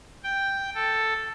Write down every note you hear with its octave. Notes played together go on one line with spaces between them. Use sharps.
G5
A4